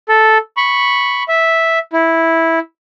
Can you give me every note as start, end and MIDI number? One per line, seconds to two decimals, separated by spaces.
0.09 0.38 69
0.57 1.23 83
0.57 1.23 85
1.28 1.79 76
1.93 2.59 64